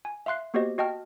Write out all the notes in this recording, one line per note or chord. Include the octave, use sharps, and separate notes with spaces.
G#5
E5 F5 C6 F#6 C7
A#3 B3 F#4 G4 C5 D#5
F#4 D#5 G5 A5 F6